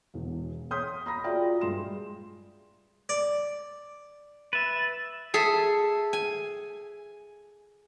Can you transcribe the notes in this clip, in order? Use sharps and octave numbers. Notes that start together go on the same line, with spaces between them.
E1 E2
C#5 C6 D#6 G6 B6
A#5 B5 A#6
F4 F#4 G#4 D5 E5 G5
G2 G#3 C6 E7
D5
B4 E5 A6
G#4 A4 E5
G#5